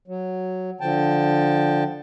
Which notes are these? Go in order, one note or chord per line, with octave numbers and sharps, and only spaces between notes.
F#3
D3 F3 G5 A5